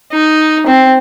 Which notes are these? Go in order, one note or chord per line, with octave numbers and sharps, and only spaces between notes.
D#4
C4